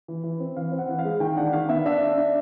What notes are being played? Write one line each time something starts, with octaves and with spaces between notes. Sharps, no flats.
E3
E3
C4
E3 F5
C4
F#5
E3
F5
G#3
D#3 G5
D4 F#5
D#3 F5
B3 E5
D4 E5
D4
D4